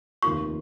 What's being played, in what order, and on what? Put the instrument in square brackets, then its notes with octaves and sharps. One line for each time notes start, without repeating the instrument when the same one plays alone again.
[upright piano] F1 D#2 D#3 A#3 F4 [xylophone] C#6